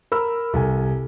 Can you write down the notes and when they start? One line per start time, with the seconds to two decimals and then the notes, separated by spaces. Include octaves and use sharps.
0.12 A#4 B5 E6
0.53 C2 A4 G#5